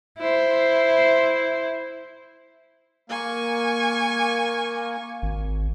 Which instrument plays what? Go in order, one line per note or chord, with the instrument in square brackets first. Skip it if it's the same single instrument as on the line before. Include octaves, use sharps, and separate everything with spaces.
[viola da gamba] E4 C5
[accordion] A#3 [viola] G#5 C#6
[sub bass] G#1